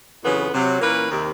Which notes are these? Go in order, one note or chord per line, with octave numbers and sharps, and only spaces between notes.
F2 C#3 E3 F#3 B3
C3 F#3
A#2 E3 A#3 C#4 A#4 B4
D#2 C3